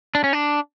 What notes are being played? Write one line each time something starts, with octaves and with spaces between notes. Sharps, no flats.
D4
C#4
D4